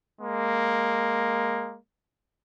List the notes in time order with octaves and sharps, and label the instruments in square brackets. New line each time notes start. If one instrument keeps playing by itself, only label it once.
[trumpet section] G#3 A#3